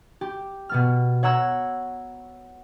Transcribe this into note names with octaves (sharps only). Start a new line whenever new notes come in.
G4
B2 B3 F6
C#5 F#5 A#5 E6 G#6